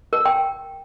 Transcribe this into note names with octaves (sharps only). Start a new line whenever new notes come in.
A#4
G5